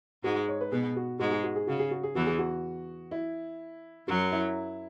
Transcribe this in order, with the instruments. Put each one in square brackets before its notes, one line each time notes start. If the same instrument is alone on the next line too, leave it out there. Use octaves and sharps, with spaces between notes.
[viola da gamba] G#2 G#3 [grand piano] F#4
[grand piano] C#5
B4
[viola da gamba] B2 B3 [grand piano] G#4
[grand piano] F#4
[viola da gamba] G#2 G#3 [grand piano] F#4
[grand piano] G#4
F#4
G#4
[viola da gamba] C#3 [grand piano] F#4
[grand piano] G#4
F#4
G#4
[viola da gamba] E2 E3 [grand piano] F#4
[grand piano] G#4
F#4
E4
[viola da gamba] F#2 F#3 [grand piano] F#4
[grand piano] E4